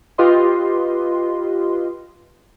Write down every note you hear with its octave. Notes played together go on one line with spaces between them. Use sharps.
F4 G4 B4 D#5 C6